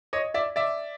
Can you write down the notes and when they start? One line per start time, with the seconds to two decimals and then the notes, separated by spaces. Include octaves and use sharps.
0.13 C#5 D#5
0.34 D5 E5
0.56 D5 E5